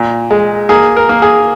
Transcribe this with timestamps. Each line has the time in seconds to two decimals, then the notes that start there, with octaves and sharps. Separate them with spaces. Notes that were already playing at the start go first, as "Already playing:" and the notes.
Already playing: A#2
0.31 G#3
0.69 A#3 G#4
0.96 A#4
1.09 A#3
1.22 G#4